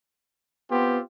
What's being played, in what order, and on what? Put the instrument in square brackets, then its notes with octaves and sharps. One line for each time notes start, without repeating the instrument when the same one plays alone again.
[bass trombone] B3 [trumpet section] C4 F4 G4